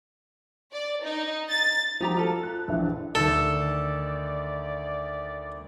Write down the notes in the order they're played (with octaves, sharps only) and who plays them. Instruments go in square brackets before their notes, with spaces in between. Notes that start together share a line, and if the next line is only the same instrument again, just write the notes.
[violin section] D5
D#4
A6
[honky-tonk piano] F3 [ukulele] D#4 G4 A#5
[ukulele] F4 A4
[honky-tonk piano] F#6
A#1 E3 E5
[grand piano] D2 D#3 [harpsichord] A4 [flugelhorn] D5